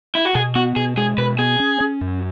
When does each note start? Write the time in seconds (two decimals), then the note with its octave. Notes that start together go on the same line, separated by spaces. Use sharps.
0.15 E4
0.25 F#4
0.35 B2 G#4
0.55 B3 F#4
0.76 B2 G#4
0.97 G#3 G#4
1.18 B2 B4
1.38 B3 G#4
1.60 C#4
1.81 C#4
2.01 F#2